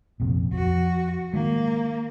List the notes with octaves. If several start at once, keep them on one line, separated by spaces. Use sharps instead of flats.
A#1 F2 C3
F2 F#4
D#3 G#3 A#3